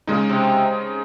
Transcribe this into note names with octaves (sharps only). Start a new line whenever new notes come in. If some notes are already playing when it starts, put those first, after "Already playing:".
A#2 C#3 G#3 D#4
C3